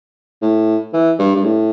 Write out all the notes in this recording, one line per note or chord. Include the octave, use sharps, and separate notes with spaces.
A2
E3
G2
G2
A2